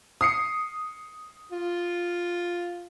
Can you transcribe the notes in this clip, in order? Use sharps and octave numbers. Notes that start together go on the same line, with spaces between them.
D#6 C7 C#7
F4